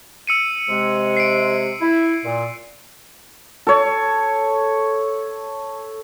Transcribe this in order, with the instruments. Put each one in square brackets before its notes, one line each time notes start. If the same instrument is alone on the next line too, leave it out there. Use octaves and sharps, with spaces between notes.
[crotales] E6 C#7 D#7
[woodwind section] C3 G#3
[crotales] C7 D7
[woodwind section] E4
A#2
[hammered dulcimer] A4 C#5